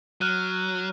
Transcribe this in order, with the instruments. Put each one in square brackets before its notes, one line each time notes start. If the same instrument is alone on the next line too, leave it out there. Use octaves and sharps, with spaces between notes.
[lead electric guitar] F#3 [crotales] F6 F#6 D#7